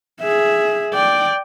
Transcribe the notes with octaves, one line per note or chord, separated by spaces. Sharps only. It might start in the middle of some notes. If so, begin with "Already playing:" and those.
G#4 E5
D5 G5